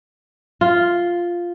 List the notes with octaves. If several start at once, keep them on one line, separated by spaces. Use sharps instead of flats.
F4